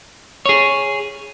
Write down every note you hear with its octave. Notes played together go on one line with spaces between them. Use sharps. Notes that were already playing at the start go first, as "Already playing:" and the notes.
G#4 C#5